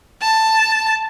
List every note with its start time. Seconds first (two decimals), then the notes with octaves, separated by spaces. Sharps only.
0.21 A5